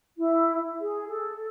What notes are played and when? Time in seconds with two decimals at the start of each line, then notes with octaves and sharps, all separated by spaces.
0.17 E4
0.80 G#4
1.09 A4